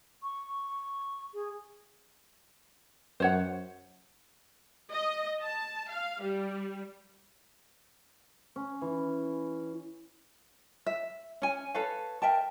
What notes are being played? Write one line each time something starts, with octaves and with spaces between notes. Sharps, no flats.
C#6
G#4
F#2 C5 C#5 F#5
D#5
A5
F5
G3
C#4
E3
E5
C#4 G#5
A4 B4 C#5 F5
A#4 E5 G5 A5